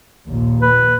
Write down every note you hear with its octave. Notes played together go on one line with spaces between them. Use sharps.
A#1 D#2 A#2
B4